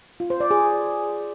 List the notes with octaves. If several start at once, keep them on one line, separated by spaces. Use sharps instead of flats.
F4
C5
D5
G#4